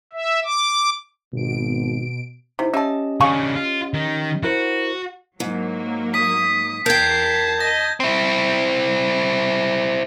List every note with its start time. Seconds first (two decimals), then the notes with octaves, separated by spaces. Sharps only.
0.13 E5
0.44 D6
1.33 G#1 B2 D7
2.59 C3 D#4 E4
2.74 C#4 G4 D#5 E5 A5
3.20 C#3 D4 G#4 F5 C#6
3.55 F4
3.94 D#3
4.43 E4 F#4 A#4 C5
5.40 G#2 F#3 A#3
6.14 D#6 B6
6.86 E2 A#4 G5 A5 G6 G#6 C7
7.60 D#5 A#6
8.00 C4 E4